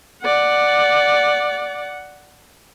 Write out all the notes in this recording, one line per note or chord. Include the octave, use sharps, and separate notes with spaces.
D5 F#5